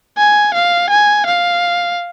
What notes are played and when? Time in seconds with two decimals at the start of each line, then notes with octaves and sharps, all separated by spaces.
0.18 G#5
0.54 F5
0.90 G#5
1.26 F5